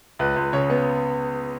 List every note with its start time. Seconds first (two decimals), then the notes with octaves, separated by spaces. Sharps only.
0.19 C#2 B4
0.36 C#2
0.53 C#3 C#5
0.70 B3